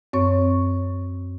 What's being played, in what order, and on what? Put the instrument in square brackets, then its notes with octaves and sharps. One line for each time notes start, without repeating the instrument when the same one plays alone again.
[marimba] F#2 C4 C#5 C#6